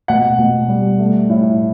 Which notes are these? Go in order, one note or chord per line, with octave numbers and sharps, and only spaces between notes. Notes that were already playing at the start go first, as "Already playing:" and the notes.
B2 F#5
B2
G3
A3
A2